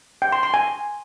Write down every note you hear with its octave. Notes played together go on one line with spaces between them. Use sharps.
G5
C6
C6
G#5